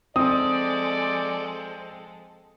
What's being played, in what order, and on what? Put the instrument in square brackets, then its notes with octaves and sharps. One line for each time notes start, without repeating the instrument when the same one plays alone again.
[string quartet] F3 G#3 A4 [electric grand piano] C4 [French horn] D5 [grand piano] D#6